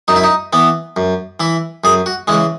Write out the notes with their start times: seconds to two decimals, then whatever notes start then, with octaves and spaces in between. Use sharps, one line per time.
0.08 F#2 D#4
0.16 E4
0.24 D#4
0.53 E3 B3
0.97 F#2
1.40 E3 E4
1.84 F#2 G#4
2.06 F#4
2.28 C#3 E3 G#3